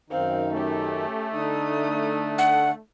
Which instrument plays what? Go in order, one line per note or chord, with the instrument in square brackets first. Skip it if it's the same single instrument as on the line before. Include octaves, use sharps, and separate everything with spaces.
[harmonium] F#2 D#3 D#4 [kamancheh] C4 F5
[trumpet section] A3 [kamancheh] C#4 G4
[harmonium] D3 D4 [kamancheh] D#4 D#6
[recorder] F#5